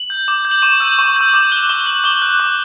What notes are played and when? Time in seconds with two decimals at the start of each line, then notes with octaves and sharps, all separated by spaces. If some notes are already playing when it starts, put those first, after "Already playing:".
Already playing: F#7
0.10 G6
0.28 D6
0.45 G6
0.51 F#7
0.62 C#6 E7
0.80 E6 G6
0.99 C#6
1.16 E6 G6
1.34 D6
1.52 F#6 G7
1.69 D6 G7
1.86 F#6 F#7
2.04 D6 G7
2.22 F#6
2.40 D6